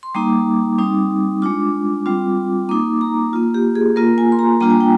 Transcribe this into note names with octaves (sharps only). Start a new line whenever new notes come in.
C6
G3 A#3 D#4 D6
G3 C4 D#4
G#3 D4 F4 D6
G3 C4 F4
A#3 D#4 D6
A#5
A#3 F4
G4
G#4
A#3 F4 A#4
G#5
C6
A#5
G3 A#3 D4 F4 A#5
G#5
G5